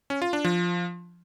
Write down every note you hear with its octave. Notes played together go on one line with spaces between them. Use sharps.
C#4
F4
D4
F3